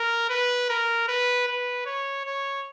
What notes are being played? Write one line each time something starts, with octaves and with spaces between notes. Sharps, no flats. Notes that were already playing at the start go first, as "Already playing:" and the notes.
Already playing: A#4
B4
A#4
B4
B4
C#5
C#5